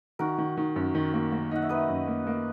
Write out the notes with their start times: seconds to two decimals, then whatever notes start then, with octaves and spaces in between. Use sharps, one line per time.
0.19 D#3 F#4 A#4
0.38 D#3
0.57 D#3
0.76 F#2
0.95 D#3
1.14 A#3
1.32 A#3
1.51 D#4 F#5
1.62 E5
1.69 D#4 B4 D#5
1.89 F#2
2.07 A#3
2.27 A#3